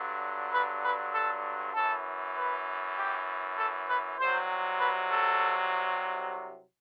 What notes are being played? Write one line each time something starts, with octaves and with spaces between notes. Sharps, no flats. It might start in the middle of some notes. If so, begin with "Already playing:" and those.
Already playing: G2 D3 F#3
B4
B4
A4
F#2 E3 A4
B4
G4
A4
B4
C2 C3 F#3 C5
B4
A4